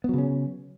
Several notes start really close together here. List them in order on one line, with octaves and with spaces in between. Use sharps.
B3 F#3 C#3 C#4